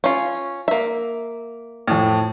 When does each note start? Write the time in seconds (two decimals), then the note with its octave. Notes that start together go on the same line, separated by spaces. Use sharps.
0.04 C#4 F4
0.68 A#3 E5
1.88 F2 A2